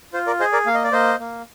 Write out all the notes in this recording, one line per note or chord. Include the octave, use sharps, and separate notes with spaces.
F4 C5
A#4 D5
G#4 C5 D#5
A#4 D5
A#3 F5
D#5
D5
A#3 C5 D#5
A#3